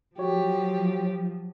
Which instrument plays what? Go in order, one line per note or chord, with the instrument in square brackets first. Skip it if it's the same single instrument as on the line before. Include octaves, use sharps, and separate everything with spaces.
[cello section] F3 F#3 [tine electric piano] F#4 C#5 [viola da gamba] G4